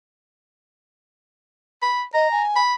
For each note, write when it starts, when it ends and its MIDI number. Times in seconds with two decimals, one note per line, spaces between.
1.82 2.03 83
2.14 2.30 75
2.14 2.43 82
2.31 2.60 80
2.56 2.75 83